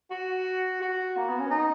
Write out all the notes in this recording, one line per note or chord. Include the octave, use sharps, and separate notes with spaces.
F#4
F#4
A#3
B3
C#4
D#4